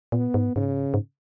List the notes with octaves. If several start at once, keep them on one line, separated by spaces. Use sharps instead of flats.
A#2 B3
G#2
G#2 C#3
G#2